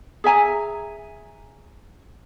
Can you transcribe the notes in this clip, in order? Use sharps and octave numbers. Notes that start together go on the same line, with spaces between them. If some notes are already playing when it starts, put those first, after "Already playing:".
G#4 E5 G#5 A#5